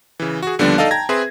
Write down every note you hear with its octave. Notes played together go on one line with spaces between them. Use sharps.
C#3 E3
F#4 G#4
D#2 D3 F3 G3 B3 D4
D#4 A4 D5 D#5 F5 A5
G5 A5 A#5 G#6 A#6
C4 G#4 B4 E5 C6